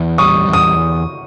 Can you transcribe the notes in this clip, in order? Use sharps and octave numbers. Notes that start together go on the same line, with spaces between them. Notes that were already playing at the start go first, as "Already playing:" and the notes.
Already playing: E2
G3 C#6 D#6
E2
D#6